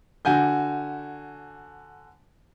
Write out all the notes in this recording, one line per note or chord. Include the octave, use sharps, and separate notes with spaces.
D3 F#4 G#5 G6